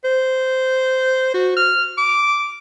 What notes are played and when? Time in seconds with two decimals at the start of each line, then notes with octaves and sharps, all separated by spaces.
0.05 C5
1.34 F#4
1.57 F6
1.98 D6